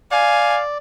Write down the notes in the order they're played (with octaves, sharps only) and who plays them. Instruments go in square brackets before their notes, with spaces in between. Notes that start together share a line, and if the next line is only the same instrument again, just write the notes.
[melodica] D5 [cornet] F5 [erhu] G#5